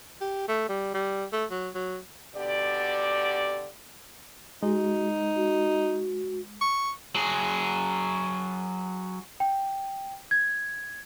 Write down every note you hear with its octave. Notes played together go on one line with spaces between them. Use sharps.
G4
A3
G3
G3
A3
F#3
F#3
B2 D3 G4 D5
G#3 D#4 F#4
F#4
C#6
F#3 G#4
G5
G#6